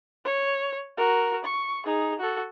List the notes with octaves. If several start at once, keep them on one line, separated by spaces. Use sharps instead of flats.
C#5
F#4 A#4
C#6
D#4 G#4
F#4 A4